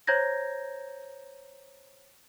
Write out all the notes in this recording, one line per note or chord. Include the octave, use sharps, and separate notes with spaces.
C5 C#5 A#5 G6 G#6 A#6